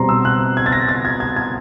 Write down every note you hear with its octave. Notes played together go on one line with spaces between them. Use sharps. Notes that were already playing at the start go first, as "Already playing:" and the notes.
Already playing: B2 G3 C4 A#5 C6
E6
F#6
G#6
A6
A#6
A6
G#6
G#6
G#6